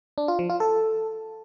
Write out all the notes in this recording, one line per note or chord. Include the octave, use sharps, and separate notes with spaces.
D4
F4
F3
F4
A4